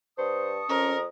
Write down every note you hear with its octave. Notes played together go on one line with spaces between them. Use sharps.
G2 C5 A5 C#6 D#6
F2 C#4 A#4